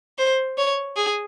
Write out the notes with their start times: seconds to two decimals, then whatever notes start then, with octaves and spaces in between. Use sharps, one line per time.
0.18 C5
0.58 C#5
0.96 G#4